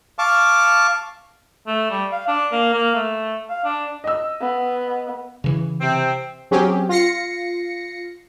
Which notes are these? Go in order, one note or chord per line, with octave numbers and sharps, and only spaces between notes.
F5 A5 C#6 D6
A3
G3
F5
D4
A#3
A#3
A3
F5
D4
D#5 E6
B3
C#3 E3
C3 C4
F#3 C4 C#4 G4 G#4
F4 A#6 C7 C#7